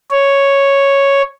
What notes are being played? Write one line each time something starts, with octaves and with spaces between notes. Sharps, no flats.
C#5